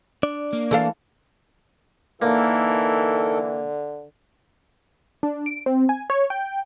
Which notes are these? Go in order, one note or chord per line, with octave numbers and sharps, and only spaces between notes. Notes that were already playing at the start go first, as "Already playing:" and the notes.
D4 D5
A#3
E3 A4 F5
D3 E3 A#3 D#4 A4 A#4
D4
D7
C4
G#5
C#5
G5